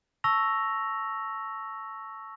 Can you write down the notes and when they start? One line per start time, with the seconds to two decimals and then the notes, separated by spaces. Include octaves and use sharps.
0.24 A5 C#6 E6 A#6 F7